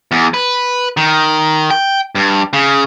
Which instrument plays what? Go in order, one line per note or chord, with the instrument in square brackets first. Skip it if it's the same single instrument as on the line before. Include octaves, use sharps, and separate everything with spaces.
[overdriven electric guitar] E2
B4
D#3
G5
G2
C#3